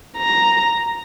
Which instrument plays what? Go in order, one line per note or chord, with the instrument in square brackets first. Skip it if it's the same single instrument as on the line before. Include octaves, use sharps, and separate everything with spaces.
[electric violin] A#5